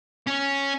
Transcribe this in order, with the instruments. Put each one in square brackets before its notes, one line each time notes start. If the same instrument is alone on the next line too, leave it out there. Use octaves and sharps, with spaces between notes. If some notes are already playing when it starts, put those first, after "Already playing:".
[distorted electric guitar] C#4